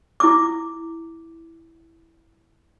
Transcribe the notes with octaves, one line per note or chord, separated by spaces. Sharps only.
E4 D6